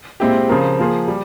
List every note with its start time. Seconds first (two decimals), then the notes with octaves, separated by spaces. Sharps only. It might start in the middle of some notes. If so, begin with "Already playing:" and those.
0.20 A#2 G#3 C4 E4 G4
0.49 C#3 F3 C4 F4 A#4
0.79 F3 A#3 F4 G#4 C5
1.08 G3